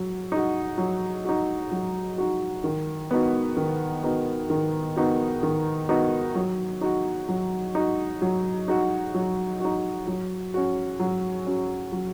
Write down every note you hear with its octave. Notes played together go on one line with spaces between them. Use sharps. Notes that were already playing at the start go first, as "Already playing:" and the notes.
Already playing: F#3
D#4 F#4
F#3
D#4 F#4
F#3
D#4 F#4
D#3
B3 D#4 F#4
D#3
B3 D#4 F#4
D#3
B3 D#4 F#4
D#3
B3 D#4 F#4
F#3
D#4 F#4
F#3
D#4 F#4
F#3
D#4 F#4
F#3
D#4 F#4
F#3
C#4 F#4
F#3
C#4 F#4
F#3